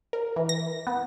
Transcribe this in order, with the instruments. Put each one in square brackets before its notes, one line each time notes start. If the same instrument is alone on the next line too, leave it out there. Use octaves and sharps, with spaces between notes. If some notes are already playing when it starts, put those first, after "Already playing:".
[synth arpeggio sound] A#4
E3
A#6
B3